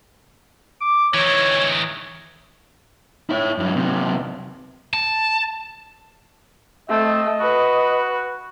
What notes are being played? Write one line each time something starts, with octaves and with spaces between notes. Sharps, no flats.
D6
E3 D#4 C#5
E4 C#5
G2 F#3
C3 F#3
A5
A3 C4 A4 D#5
F#4 B4